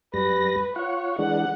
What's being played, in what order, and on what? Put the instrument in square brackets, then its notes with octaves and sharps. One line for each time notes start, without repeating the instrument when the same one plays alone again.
[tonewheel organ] F#2 G3 A#6 [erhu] B4
[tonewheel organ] F4 F#5 [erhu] C#5
[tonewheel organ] E3 G#3 D4 [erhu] F#5